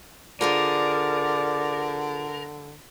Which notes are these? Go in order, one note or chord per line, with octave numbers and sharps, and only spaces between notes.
D3 F4 G#4 A#4 C5 D5